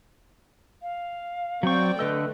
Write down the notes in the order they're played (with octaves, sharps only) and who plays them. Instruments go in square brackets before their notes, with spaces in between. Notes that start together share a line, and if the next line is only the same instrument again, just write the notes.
[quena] F5
[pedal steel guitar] F#3 C#6 [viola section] C4 D5 G5
[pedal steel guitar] D3 D#5 E6 [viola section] A3 [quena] B4